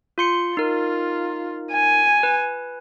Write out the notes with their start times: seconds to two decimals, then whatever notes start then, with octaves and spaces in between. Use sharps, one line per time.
0.18 F4 C6 C#7
0.57 D#4 F4 A#4
1.72 G#5
2.23 B4